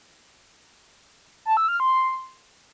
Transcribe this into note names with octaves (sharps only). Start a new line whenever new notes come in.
A5
E6
F6
C6